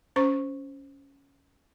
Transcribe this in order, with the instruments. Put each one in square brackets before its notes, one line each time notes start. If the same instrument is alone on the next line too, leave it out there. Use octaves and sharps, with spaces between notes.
[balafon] C#4 C5 C#6